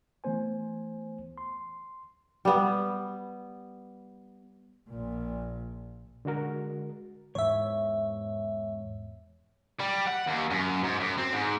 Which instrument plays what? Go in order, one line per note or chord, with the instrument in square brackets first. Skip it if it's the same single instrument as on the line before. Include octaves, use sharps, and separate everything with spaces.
[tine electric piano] E3 A3 B3 C5 G#5
C6
[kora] G3 B3
[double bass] A#1 A#2
[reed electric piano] D3 G#3 F#4 A#4
[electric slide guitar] E2 G#2 [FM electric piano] C#5 E5
[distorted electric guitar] G3
F#5
D#2
F#2
G#2
F#2
C4
G#2